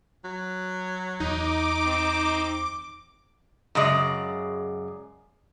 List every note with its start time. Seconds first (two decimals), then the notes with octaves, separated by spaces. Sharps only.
0.24 F#3
1.20 E2 D#4 D6
1.86 C4
3.75 F#2 C#3 G#3 D5